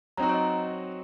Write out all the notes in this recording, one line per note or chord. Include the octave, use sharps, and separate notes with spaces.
F#3 C4 D#4 F#4 A#5
C#5
D#5